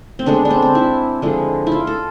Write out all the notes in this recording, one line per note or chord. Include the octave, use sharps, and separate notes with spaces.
C4
D3 G#3 B3 D4
D4
C4
C4
E4
D3 F3 G#3
E4
F4
A4